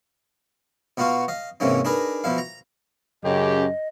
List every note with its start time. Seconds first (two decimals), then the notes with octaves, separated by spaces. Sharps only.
0.97 B2 B3 F4 F#4 F5
1.28 D#5 F5
1.60 G#2 C3 E3 A#3 C#4 D#4
1.85 D4 D#4 G#4 A#4 B4 D#5
2.24 B2 F3 E4 F5
2.38 A#5
3.24 F#2 C#3 G4 D#5